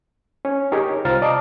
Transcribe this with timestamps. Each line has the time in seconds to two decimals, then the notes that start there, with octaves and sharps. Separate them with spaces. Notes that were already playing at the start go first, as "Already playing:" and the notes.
0.45 C#4 C#5
0.72 D#4 G4 G#4 A#4 C#5
1.05 C2 F4 C5 A#5 F6 A6
1.22 D5 D#5 A5 A#5 D6